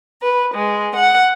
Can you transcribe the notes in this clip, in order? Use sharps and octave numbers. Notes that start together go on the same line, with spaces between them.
B4
G#3
F#5